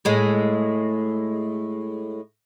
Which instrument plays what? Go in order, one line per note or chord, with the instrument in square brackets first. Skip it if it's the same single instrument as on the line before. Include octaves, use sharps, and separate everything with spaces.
[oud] A2 G#3